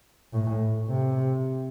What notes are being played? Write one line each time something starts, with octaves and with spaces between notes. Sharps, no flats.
A2
C3